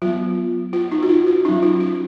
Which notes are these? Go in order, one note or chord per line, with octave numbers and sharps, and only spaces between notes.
F#3 B3 F4
F4
D#4
F#4
F4
F4
F#3 C#4 D#4
F4
F4